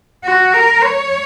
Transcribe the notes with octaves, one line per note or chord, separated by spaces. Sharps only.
F#4
A#4
C#5